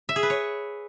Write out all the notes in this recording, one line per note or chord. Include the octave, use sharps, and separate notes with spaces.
E5
G#4
B4
C#5